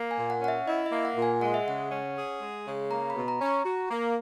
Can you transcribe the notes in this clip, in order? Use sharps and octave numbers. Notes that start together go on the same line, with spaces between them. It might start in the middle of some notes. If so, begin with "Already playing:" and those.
Already playing: A#3
G#5
A#2
F#5
C#4 F#5
E5
E4 D#5
E5
A#3
F#5
A#2
G#5
G#3 F#5
E5
C#3 F#5
C#4
G#4
G#3
C#3
A#3 A#5
B5
B2
A#5
C#4
A#5
F#4
A#3